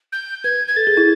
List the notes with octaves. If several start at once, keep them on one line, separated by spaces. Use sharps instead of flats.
G6
B4 G#6
G#6
A4 A6
G#4
E4